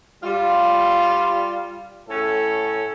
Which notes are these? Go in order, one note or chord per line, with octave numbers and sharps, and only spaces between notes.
G3 F4
A2 C#4 A4